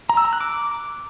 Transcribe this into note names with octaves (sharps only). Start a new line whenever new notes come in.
A#5
E6
A#5
F#6
D6